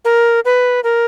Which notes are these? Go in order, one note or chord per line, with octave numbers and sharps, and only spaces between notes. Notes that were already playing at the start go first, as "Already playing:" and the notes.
A#4
B4
A#4